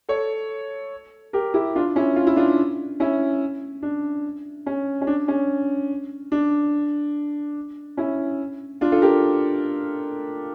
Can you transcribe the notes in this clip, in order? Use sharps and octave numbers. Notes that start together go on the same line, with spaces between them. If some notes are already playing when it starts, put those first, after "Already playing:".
A4 C#5
G4 A#4
E4 G4
D4 F4
C#4 E4
F4
E4
D4 F4
C#4 E4
D4
C#4
C#4
D4
C#4
D4
C#4 E4
D4 F4
F4 A4
G4 A#4